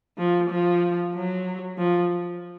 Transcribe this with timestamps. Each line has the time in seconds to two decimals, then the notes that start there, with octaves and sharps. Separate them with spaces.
0.18 F3
0.50 F3
1.14 F#3
1.78 F3